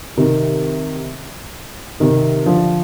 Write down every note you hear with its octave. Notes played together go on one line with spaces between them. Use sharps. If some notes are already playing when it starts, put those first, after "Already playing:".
C3 D#3
C3 D#3
D3 F3